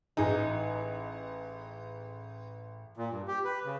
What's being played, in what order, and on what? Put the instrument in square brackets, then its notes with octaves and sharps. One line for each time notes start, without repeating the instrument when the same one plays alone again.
[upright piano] A1 G#4 G#5 [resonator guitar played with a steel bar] D#4
[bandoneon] A#2
G2
G4
B4
C#3